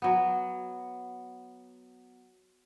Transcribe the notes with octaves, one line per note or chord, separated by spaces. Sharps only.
F#3 B3